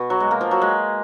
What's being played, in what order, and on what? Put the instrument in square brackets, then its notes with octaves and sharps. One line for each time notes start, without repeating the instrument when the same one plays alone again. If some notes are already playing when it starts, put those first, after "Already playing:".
Already playing: [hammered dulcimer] B2
F#3
G#3
A#3
F3
F#3
G#3